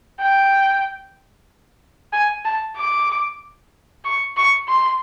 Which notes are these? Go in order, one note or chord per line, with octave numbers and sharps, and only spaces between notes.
G5
G#5
A5
D6
C#6
C#6
C6